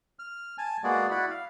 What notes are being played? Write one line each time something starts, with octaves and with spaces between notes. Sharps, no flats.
F6
G#5 A5
G#3 A#3 B3 F#4 G#4 D5
E4 F#4 D5 F#5 B5
F5